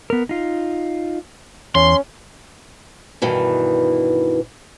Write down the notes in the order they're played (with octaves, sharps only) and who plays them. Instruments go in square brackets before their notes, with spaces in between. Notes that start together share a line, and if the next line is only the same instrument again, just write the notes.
[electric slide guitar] B3 A#4
D#4 F4
[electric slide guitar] E2 [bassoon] C#4 [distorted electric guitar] C6
[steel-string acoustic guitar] G2 B2 D#3 E3